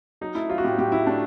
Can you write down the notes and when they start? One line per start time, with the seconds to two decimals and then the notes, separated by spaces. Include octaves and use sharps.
0.21 F#3 D#4
0.35 A3 E4
0.49 F#3 F4
0.58 F#4
0.64 A2 G4
0.78 A2 G4
0.92 F#3 E4
1.07 A3 D4